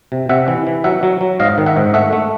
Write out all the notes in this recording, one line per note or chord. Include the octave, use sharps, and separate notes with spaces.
C3
C3 E5 F#5
E3
E3
F#3 E5 F#5
F#3
F#3
G#2 D#5 F5
D#3
E5 F#5
G#2
A3 E5 F#5
A3